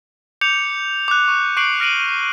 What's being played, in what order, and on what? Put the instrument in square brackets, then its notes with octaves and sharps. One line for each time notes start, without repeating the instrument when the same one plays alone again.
[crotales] D6 G6 C#7 F7
D6 F#6
C#6
C#6 D6 F#6 C7 D7 F#7
F6 A#6 D7 D#7 F#7